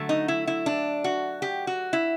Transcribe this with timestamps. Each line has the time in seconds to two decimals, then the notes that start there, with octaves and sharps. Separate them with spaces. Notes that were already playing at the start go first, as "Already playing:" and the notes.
Already playing: D3 F#3 A3
0.09 D#4
0.28 E4
0.47 E4
0.66 D4
1.04 F#4
1.42 G4
1.67 F#4
1.93 E4